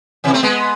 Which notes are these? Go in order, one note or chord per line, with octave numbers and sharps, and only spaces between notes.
C3 E3
A3 C4
G#3 B3